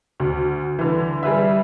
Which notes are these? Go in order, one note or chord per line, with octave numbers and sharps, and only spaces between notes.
D2
D3 E3
G3 G#4 B4 E5